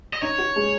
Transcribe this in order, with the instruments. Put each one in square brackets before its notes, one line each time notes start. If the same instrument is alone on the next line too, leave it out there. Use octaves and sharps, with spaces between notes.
[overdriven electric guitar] D#5
[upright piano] D#4 [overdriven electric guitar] C#5
[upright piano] F#4
G#3